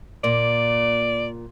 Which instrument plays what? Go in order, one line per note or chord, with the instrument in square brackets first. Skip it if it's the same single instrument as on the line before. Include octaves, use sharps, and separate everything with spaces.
[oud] A#2 [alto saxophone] D5